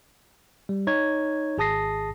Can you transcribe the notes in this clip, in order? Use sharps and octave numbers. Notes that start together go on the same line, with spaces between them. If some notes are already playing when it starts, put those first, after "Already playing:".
G3
D#4 C#5 G#6
G#1 G#4 A5 D#6 A#6 C7